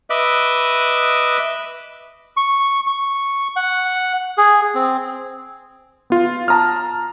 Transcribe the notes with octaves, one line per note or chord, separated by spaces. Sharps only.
B4 D#5 E5 D6 F#6
C#6
C#6
F#5
G#4
C4
B3 F4
A5 A#5 D#6 F6